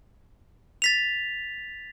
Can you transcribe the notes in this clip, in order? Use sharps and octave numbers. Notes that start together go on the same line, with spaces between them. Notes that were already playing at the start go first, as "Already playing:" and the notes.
A6 B6 F7